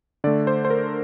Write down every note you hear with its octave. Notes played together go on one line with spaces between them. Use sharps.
D3 A3 D5
C5
C5
A#4